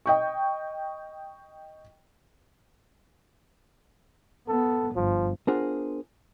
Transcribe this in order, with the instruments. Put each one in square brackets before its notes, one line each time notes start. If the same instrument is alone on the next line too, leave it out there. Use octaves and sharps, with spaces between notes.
[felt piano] D#5 G5 C#6
[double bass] B3 [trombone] A4
[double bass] G1 [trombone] F3
[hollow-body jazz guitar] B3 D4 F4 G#4 A#4 C5